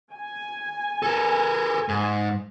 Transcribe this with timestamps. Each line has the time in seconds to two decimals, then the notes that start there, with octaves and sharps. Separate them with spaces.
0.12 G#5
1.02 A4 A#4
1.88 G#2